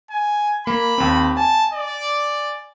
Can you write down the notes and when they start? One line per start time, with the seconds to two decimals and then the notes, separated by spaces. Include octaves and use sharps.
0.10 G#5
0.67 A#3 B5
0.98 D#2 C4
1.37 G#5 A5
1.74 D5